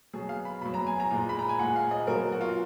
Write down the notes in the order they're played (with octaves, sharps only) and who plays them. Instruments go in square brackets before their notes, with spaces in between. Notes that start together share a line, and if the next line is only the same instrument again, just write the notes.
[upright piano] B2 F#3 G#4
F5
B5
B2 F#3 B5
A#5
G#5
A#5
A#2 G#3
B5
A#5
G#5
A#2 G#3 F#5
F5
D#5
B2 F#3 A#4
F#4
F4
F#4